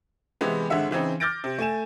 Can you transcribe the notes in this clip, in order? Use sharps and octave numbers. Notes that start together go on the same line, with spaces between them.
C3 E3 G#3 B3
G#1 D3 G#3 E5 F#5
C#3 E3 C4 D#4
D6 F6 G6 A6 A#6 D7
C3
A3 G#5 E7